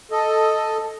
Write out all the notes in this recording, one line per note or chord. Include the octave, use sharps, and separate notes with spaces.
A4 D#5